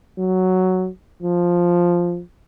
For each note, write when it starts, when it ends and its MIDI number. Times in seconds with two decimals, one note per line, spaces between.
0.19 0.88 54
1.23 2.21 53